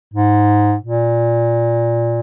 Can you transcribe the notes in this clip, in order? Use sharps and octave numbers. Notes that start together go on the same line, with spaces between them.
G#2
A#2